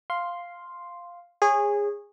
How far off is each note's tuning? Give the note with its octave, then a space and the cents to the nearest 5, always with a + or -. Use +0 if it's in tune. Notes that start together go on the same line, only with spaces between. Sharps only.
F5 +0 C6 +0
G#4 -20 C#5 -15